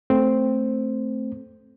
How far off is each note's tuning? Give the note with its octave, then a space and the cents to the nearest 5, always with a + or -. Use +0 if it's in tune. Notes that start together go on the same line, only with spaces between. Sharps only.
A3 +0 C4 +0